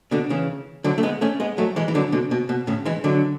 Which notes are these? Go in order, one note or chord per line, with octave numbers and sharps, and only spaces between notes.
B2 D3
C#3 E3
D3 F#3
A3
G#3 B3
A3 C#4
G#3 B3
F#3 A3
E3 G#3
E3
D3 F#3
B2 D3
B2
B2
A2 C#3
E3 G#3
D3 F#3